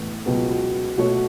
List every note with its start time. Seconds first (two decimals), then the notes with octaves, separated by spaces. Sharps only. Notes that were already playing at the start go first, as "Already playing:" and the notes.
Already playing: A1 A2 E3 B3
0.26 C#2 B2 F#3 B3
0.97 B2 A3 F#4 C#5